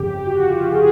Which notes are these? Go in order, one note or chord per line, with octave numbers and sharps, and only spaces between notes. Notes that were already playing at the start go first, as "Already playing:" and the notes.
Already playing: G1 F2 C#3 G4
G4
F#4
F4
G4
G#4